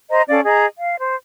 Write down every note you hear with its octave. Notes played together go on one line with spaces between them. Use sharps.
C5 D#5 A#5
C#4 A4 D5 F5
G#4 D#5 A#5
F5
C5